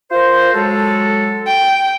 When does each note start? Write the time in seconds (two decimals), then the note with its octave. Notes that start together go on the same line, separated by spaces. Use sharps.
0.11 F4 A#4 C5
0.54 F#3 G#3 A4
1.47 G5